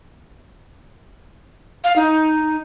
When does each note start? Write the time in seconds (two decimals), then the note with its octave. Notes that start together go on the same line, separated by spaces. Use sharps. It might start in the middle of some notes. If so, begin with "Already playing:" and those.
1.84 F5
1.96 D#4